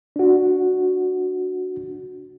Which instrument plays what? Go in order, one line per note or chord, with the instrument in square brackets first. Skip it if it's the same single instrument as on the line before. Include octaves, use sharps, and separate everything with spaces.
[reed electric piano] D4 F#4